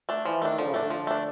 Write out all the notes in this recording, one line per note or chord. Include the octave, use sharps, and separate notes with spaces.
A3 D4
E3 F3
D#3 A3 D4
D3 F3
C#3
A2 A3 D4
D3
F3
A3 D4